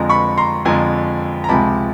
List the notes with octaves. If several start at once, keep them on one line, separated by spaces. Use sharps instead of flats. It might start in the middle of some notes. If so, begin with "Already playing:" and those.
Already playing: F2 D3 F3 G#3 A#5
B5 C#6
A#5 C6
F2 D3 F3 G#3 G#5 A#5
A#5
C#2 C3 F3 G#3 A5 B5